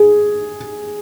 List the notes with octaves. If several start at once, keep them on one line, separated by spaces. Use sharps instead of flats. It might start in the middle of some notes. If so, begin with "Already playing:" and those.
Already playing: G#4